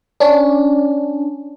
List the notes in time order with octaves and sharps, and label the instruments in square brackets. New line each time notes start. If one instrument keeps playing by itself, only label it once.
[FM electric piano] C#4 D4